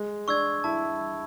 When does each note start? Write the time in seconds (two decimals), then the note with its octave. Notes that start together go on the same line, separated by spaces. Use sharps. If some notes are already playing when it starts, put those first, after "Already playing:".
Already playing: G#3
0.28 D4 C#6 E6 G#6
0.64 E4 A5